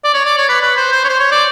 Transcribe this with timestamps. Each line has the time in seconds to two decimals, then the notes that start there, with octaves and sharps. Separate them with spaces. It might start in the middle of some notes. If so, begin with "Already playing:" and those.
0.04 D5
0.14 C#5
0.25 D5
0.38 C#5
0.49 B4
0.61 B4
0.77 C5
0.92 C5
1.04 C#5
1.08 C5
1.19 C#5
1.31 D5